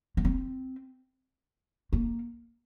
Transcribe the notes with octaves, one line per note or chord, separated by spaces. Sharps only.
A#3
C4
A#3